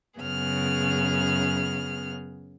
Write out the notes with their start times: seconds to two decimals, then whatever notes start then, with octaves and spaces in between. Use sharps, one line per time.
0.19 F#2 C#3 B3 G#4 F6